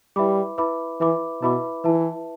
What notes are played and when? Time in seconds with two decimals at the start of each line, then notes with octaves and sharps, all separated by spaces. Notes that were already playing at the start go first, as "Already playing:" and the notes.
0.16 G3 E4 B4 E5 B5 D6
0.58 E4 B4 E5 B5 D6
1.00 E3 E4 B4 E5 B5 D6
1.42 B2 E4 B4 E5 B5 D6
1.84 E3 E4 B4 E5 A5